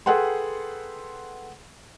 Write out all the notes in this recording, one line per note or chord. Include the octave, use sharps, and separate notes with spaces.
G#4 A4 B4 F#5 G5 C6